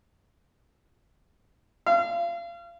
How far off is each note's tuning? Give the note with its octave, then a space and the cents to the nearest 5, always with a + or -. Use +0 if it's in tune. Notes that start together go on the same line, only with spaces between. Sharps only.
F5 -35